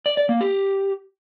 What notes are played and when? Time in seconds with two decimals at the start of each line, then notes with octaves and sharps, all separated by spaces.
0.06 D5
0.17 D5
0.29 A#3
0.41 G4